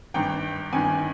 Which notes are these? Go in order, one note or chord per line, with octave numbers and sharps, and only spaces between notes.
G#1 G2 D#3 G5
G#1 G2 D#3 G#5